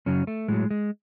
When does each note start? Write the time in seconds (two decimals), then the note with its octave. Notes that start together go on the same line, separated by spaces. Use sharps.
0.06 F#2 C#3 F#3 C#4
0.27 A3
0.48 A2 F#3 G#3
0.71 G#3